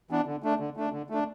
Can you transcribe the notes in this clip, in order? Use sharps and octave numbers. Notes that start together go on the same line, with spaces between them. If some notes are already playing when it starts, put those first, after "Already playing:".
E3 B3 D4
D3
A3 D4
D3
A3 D4
D3
A3 D4